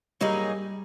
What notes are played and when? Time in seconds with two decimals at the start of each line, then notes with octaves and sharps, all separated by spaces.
0.21 F#3 G3 A#3 D#4 G#4